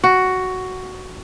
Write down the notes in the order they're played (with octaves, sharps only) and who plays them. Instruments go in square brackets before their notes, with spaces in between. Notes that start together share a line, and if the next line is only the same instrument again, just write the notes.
[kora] F#4